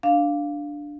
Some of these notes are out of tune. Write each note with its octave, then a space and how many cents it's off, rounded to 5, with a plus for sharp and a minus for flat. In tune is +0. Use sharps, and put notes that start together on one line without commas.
D4 +0 F5 +0